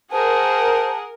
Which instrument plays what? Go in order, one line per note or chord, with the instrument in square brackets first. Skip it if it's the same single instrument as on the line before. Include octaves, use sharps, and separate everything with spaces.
[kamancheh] G#4 F#5 [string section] A#4 [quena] C5 [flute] A5